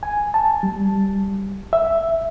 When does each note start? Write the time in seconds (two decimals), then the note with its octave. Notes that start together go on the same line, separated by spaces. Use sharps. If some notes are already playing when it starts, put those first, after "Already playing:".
0.03 G#5
0.34 A5
0.63 G3
1.73 E5